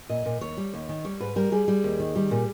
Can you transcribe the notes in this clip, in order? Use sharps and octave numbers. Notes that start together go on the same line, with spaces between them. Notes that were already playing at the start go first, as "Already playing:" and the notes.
A#2 D#5
A#2
D#2 C#5
G3
D#2
D#3
G3 C#5
G#2 B4
G3 A#4
G3 G#4
G3
D#2
D#3
G3
A#2